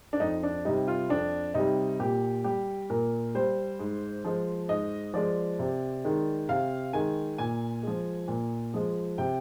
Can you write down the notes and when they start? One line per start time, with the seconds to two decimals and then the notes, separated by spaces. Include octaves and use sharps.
0.13 D4
0.20 F2 D#4
0.43 D4
0.65 C3 G3 D#4
0.88 F4
1.09 F2 D4
1.54 C3 D#4
1.60 G3
2.00 A#2 G4
2.44 G3 G4
2.90 A#2 A#4
3.35 G3 C5
3.79 G#2
4.24 F3 G#3
4.69 G#2 D#5
5.14 F3 G#3 D5
5.59 C3
6.04 D#3 G#3
6.49 C3 F5
6.93 D#3 G#3 G#5
7.38 A#2 G#5
7.83 F3 G#3
8.28 A#2
8.74 F3 G#3
9.18 C3 G5